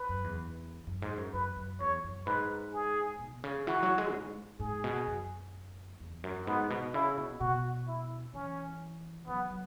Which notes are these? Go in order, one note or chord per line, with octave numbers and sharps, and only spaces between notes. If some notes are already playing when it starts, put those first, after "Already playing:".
Already playing: B4
F#2
E2
F#2
G#2
F#2
F#2 B4
F#2
E2 C#5
F#2
G#2 B4
G#4
B2
C#3
E3 F#4
F#3
G#3
G#2
G#2 G#4
B2
F#2
E2
F#2
G#2 B3
B2
C#3 E4
B2
B2 F#4
E4
E3 C#4
F#3 B3
F#3